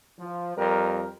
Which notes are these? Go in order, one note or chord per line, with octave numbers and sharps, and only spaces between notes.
F3
F2 G3 A#4